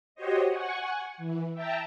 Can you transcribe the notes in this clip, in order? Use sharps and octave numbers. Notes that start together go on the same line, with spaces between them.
F#4 G4 C5 C#5 D#5
F#5 G#5 C#6
E3
E5 G5 A5 A#5